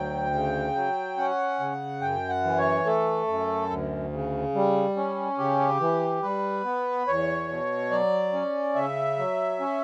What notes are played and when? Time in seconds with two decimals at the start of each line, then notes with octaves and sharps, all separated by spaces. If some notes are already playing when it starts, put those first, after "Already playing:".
Already playing: D2 F#3 G5
0.33 C#3
0.76 F#3
1.17 C#4 F#5
1.60 C#3
2.01 F#2 G5
2.29 F#5
2.44 E3
2.58 C#5
2.86 A3 A4
3.27 F#2
3.70 D2
4.12 C#3
4.55 G3
4.96 C#4
5.38 C#3 G4
5.80 E3
6.23 G3 B4
6.64 B3
7.07 E2 C#5
7.49 B2
7.91 F#3 D5
8.33 C#4
8.75 C#3 E5
9.18 F#3
9.60 C#4